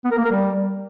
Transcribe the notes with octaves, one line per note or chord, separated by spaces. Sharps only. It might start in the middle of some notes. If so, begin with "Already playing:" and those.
B3
A#4
A#3
A#4
G3